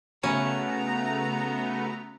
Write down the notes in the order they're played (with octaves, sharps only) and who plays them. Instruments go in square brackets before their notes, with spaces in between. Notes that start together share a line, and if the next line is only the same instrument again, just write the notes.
[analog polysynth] C#3 A3 B3 [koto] C#4 [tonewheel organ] F#4 [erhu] A#5